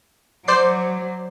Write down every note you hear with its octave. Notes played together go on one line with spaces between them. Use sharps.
F#3 C5 D5 C7